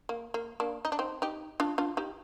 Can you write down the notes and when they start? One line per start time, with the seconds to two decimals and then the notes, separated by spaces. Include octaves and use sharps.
0.09 A#3
0.34 A#3
0.60 A#3 D4
0.85 D#4
0.92 D4
0.99 C4 D#4
1.22 D#4 G4
1.60 D4 F4
1.78 D4 F4
1.97 D#4 G4